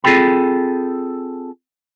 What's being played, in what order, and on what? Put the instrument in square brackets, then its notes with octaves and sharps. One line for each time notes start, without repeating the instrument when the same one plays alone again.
[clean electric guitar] C4 F4 G#4 A4 G5 B5